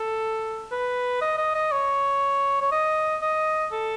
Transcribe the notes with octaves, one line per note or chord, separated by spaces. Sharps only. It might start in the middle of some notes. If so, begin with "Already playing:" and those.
Already playing: A4
B4
D#5
D#5
D#5
C#5
C#5
D#5
D#5
A4